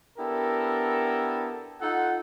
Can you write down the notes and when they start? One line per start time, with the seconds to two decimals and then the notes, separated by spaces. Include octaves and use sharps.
0.18 B3 D4 E4 G4 A4 A#4
1.82 D#4 F4 A4 F#5